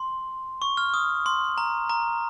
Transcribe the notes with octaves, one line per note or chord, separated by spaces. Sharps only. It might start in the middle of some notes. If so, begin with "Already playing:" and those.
Already playing: C6
C#6
F6
D#6
C6
A#5
A#5